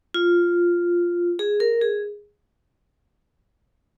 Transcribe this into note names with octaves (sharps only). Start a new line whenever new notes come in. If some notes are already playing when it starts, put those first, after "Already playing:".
F4
G#4
A#4
G#4